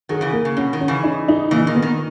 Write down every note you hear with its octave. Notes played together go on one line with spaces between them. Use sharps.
D#3 F#3 G#4
C#3 E3
A#3
C#3
B2 C#4
D#3
C#4
C#3 E3
D#4
D#4
A#2 C#3 E3
D#3
B3
D#3